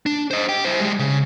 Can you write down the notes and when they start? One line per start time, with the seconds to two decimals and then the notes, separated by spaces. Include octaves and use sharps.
0.06 D4
0.31 C5 D#5
0.49 G4 G5
0.65 E4 C5
0.80 G3 G#3
0.99 C#3